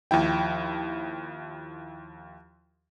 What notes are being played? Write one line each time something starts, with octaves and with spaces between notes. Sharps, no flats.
D#2 F3 E4 G5